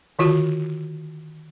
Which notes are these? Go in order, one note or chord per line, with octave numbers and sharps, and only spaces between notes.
D3 D#3 F4 F#4